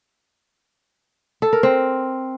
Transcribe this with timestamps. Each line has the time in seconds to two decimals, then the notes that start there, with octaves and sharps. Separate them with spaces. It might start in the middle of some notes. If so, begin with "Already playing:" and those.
1.42 A4
1.53 A#4
1.63 C4